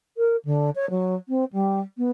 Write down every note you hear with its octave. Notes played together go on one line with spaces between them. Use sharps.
A#4
D3
C#5
F#3
C4
G3
B3